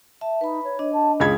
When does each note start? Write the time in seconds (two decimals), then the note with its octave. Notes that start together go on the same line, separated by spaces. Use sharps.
0.21 E5 A5
0.41 D#4 B4 B5
0.64 C#5
0.79 D4 D#5
0.93 A5
1.20 C#2 G#4 B5 G#6